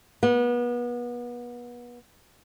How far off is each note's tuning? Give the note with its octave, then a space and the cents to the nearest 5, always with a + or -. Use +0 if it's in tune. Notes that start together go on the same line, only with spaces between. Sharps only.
B3 -30